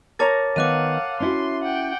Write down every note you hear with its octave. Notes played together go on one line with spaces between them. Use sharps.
A#4 C#5 A5 A#5 D6 A6
D#3 B3 B4 F5 F#5 D6 F#6 D#7
C#4 E4 F#4 C6
F#5 G5